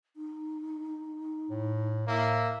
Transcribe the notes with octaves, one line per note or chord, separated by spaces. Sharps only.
D#4
A2
A2 A#3 E5